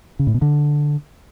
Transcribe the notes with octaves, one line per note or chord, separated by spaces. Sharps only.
C#3
A2
B2
D3